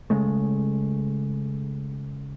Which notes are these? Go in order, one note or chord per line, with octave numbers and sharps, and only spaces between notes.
C#3 G#3 A3